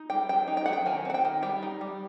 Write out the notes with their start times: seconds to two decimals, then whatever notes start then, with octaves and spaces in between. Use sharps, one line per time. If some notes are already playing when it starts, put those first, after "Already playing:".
Already playing: D#4
0.10 G3 G5
0.29 F#3 G5
0.48 D#4
0.57 G5
0.66 F#3 F#5
0.73 G5
0.86 D#3 G#5
1.05 C4 F#5
1.14 G5
1.25 D#3
1.42 G3 G5
1.63 D#4
1.81 G3